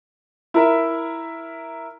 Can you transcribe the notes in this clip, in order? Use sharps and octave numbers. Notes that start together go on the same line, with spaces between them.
E4 A#4 E5